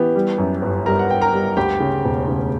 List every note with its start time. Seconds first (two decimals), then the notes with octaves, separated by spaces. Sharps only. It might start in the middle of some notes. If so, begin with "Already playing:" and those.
Already playing: E3 B3 G4
0.16 G3
0.38 F#2
0.62 G1
0.86 G3 A#4 A#5
0.99 F#5
1.10 G1 G5
1.21 A#4 A#5
1.33 G3
1.57 D2 G4 G5
1.80 C#3
2.05 E1
2.28 C#3